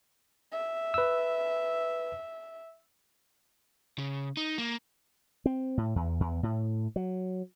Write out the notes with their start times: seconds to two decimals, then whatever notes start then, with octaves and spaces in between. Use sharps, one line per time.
0.52 E5
0.94 B4 E6
3.98 C#3
4.37 D#4
4.58 A#3
5.46 C4
5.77 A2
5.96 E2
6.20 E2
6.43 A2
6.96 F#3